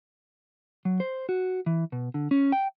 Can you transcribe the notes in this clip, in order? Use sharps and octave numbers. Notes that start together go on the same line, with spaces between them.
F#3
C5
F#4
E3
B2
D3
C#4
G5